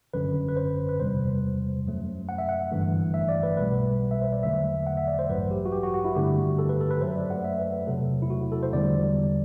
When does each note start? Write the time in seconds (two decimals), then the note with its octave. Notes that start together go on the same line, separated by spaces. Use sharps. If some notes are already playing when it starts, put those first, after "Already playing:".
0.14 G1 F#2 D3 B4
0.49 B4
0.57 C5
0.89 B4
0.99 E2 C3 G3 C5
1.85 F#2 F#3 A3
2.29 F#5
2.38 E5
2.49 F#5
2.72 G1 G2 E3 A3
3.14 E5
3.29 D5
3.43 B4
3.57 B1 B2 G3 B4
4.11 E5
4.22 C5
4.32 D5
4.43 E2 D3 F#3 A3 E5
4.87 F#5
4.97 E5
5.08 D5
5.19 C5
5.30 A1 G2 F#3 B4
5.51 G4
5.65 F#4
5.72 G4
5.83 F#4
5.94 F#4
6.05 E4
6.15 G2 D3 A3 G4
6.59 A4
6.69 B4
6.81 A4
6.91 B4
7.01 F#2 F#3 A3 C5
7.16 D5
7.30 F#5
7.44 E5
7.59 B4
7.73 B4
7.87 E2 C3 F#3 A3 A4
8.22 E4
8.30 F#4
8.52 A4
8.63 C5
8.73 E2 D3 G3 D5